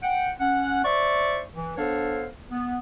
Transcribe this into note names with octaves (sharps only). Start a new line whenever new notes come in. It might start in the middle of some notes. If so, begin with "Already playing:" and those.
F#5 G5
C#4 F#5
C5 D5 E5 C#6
E3
B3 D4 A4 C5 C#5 F5
B3